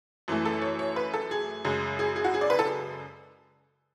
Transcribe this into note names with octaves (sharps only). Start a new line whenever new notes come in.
F#2 E3 A3
A4
C#5
C#5
B4
A4
G#4
F#2 C#3 G#3
G#4
G#4
F#4
G#4
D5
B4
A4